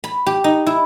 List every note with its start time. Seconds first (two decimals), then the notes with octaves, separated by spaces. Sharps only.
0.04 B5
0.27 G4
0.44 D#4
0.67 E4